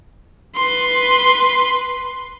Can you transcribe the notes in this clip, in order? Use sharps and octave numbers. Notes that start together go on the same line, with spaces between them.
B4 C6